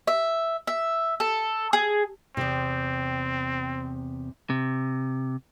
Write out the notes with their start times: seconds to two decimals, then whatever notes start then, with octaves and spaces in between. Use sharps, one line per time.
0.07 E5
0.67 E5
1.20 A4
1.73 G#4
2.37 E2 C3 C4
4.50 C3